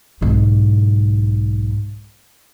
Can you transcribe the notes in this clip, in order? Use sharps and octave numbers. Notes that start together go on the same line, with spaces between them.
B1 G#2